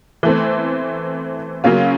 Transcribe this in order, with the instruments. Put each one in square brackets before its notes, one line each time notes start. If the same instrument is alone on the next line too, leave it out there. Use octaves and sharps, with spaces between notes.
[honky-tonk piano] E3 A3 C4
C#3 F#3 A#3 C#4 F4